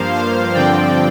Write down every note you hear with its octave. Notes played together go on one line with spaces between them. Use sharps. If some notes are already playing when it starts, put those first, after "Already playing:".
Already playing: G2 F3 A#3 C5 F5
C5 F5
G2 D3 F3 C4 D5 G5